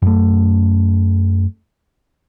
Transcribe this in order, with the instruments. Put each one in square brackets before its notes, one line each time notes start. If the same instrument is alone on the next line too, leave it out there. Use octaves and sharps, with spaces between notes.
[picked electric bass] F#2 A3